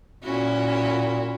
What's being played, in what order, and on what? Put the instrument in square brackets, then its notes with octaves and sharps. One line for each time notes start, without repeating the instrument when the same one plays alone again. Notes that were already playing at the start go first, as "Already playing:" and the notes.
[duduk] A#2 [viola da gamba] C#4 E4 F#4